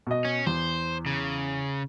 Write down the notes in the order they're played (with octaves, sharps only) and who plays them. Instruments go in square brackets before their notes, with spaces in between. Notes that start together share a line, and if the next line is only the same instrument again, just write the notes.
[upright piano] B2 D#5
[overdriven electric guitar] C#4
[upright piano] E2 [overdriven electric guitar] C5
[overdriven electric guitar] C#3